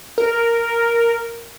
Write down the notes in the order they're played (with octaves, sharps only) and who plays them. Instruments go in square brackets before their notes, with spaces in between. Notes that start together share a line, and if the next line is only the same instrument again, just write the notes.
[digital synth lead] A#4